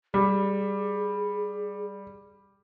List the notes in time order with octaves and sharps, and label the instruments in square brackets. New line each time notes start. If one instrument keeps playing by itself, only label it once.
[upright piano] G3 [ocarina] G#4